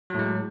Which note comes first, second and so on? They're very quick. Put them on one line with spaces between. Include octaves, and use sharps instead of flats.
F#3 A2 G#3